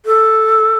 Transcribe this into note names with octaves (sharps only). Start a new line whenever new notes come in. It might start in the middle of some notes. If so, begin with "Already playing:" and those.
A4